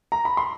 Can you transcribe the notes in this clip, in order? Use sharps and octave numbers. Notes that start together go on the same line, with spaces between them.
A#5
B5
C6